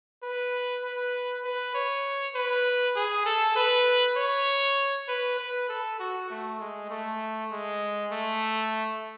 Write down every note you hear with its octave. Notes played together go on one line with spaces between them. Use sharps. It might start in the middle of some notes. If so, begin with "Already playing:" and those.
B4
B4
B4
C#5
B4
G#4
A4
B4
C#5
B4
B4
A4
F#4
A3
G#3
A3
G#3
A3